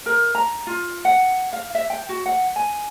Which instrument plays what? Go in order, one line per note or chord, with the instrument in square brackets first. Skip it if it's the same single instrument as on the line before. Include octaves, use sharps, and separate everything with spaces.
[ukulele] A#4
A#5
F4
F#5
F5
E5
G5
F#4
F#5
G#5